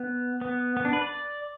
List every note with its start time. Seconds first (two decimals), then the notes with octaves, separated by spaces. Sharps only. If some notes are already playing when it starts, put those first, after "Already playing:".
Already playing: B3
0.41 B3
0.77 B3
0.85 D4
0.93 B4
1.02 D5